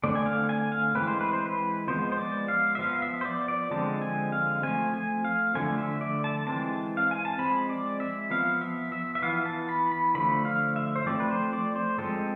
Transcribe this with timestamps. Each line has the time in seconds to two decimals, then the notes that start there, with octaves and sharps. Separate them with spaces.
0.04 D3 A3 C4 D5
0.15 G#5
0.26 F5
0.49 G#5
0.72 F5
0.95 E3 G#3 C4 B4
1.08 C5
1.21 B4
1.33 C5
1.46 B4
1.88 F3 G#3 B3 C5
2.12 C5
2.18 D5
2.48 F5
2.75 E5
2.79 F3 B3 F5
3.02 E5
3.21 C5
3.25 D5
3.48 D5
3.71 D3 F3 G#3 C4 A5
4.02 G#5
4.32 F5
4.63 F3 A3 C4 G#5
4.94 G#5
5.25 F5
5.55 D3 F3 A3 G#5
5.78 E5
6.01 D5
6.24 A5
6.47 E3 G#3 C4 A5
6.97 F5
7.11 G#5
7.25 A5
7.39 F3 G#3 C4 B5
7.69 D5
8.00 E5
8.30 F3 B3 F5
8.61 E5
8.92 E5
9.15 E5
9.22 E3 B3 F5
9.46 A5
9.69 B5
9.92 B5
10.15 D3 F3 A3 B5
10.45 F5
10.76 E5
10.96 C5
11.06 F3 A3 C4 D5
11.20 B4
11.30 C5
11.53 D5
11.76 C5
11.98 F3 G#3 C4 A4